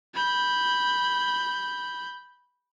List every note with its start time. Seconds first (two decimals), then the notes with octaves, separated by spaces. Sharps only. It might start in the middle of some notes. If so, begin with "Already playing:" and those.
0.14 B5 G6